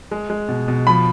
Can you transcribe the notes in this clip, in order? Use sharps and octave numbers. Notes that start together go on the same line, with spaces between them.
G#3
G#3
B2
B2
F3 B5